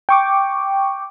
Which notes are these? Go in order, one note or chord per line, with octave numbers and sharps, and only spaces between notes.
G5 C#6 D6